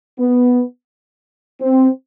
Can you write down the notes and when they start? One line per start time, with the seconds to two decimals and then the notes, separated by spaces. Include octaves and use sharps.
0.19 B3
1.61 C4